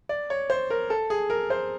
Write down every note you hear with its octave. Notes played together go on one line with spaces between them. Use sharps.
D5
C#5
C5
A#4
A4
G#4
A#4
C5